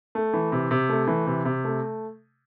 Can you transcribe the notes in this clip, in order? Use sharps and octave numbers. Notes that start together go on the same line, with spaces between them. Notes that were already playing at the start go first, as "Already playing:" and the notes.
A3
E3
C3
C3
A3
E3
C3
C3
A3